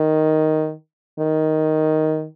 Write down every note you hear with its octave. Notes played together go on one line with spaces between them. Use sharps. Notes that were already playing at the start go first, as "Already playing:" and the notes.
Already playing: D#3
D#3